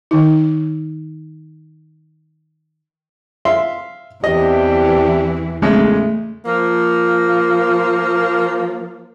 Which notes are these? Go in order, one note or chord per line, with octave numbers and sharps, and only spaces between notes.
D#3 D#4
E5 F5 C6
E2 E3 C4 D4 G4 D#5
E2 C#3 G#3 A3
F3 A#3